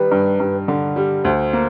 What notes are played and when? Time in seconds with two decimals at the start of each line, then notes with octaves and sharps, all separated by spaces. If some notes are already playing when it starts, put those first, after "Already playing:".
Already playing: D#3 G3 B4
0.11 G2
0.40 G2
0.68 D3
0.96 G3
1.24 D2 C5
1.53 A#3